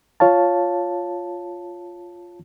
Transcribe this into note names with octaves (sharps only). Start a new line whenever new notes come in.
F4 C#5 F5 A5